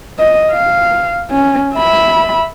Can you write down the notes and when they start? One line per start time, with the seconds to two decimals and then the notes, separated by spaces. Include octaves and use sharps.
0.19 D#5
0.51 F5
1.30 C#4
1.75 E5 B5